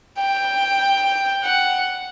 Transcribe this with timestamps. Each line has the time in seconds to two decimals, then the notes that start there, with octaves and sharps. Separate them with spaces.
0.19 G5
1.44 F#5